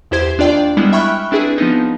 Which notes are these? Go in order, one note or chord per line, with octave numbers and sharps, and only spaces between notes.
E2 E4 G4 C5 G#6
D#2 D4 F4 D5 G5
G3 G#3 B3 E4
E5 G5 B5 C#6 F6 F#6
C4 D4 E4 G#4 B4
F3 B3 D#4